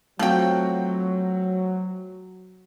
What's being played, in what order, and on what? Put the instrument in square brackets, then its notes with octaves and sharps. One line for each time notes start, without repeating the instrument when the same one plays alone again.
[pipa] F3 G5 [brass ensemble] F#3 [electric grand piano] A3 C4 F#4